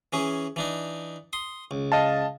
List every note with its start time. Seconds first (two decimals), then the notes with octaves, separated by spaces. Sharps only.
0.13 E3 C#4 G#4
0.56 E3 D4 D#4
1.33 C6 D#6
1.71 C#2
1.92 D#5 F5 A5